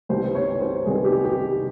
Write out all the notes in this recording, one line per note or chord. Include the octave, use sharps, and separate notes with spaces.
C2 C3 D#3 G3 B3 C5
C#5
C5
C2 C3 D#3 G3 B3 G#4
G4
G4